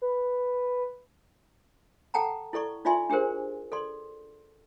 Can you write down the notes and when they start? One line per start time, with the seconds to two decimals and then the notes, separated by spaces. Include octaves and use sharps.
0.02 B4
2.14 A4 F#5 G5 A5 A#5
2.53 E4 A4 D5 C#6
2.85 D#4 F4 D5 E5 G#5 C6
3.10 D4 G4 G#4 A#4 C5
3.72 A4 D5 C6